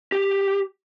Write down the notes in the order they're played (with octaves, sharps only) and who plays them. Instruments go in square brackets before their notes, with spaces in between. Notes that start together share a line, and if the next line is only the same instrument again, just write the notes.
[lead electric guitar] G4